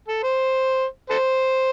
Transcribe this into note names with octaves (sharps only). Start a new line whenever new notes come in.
A4
C5
A4 C5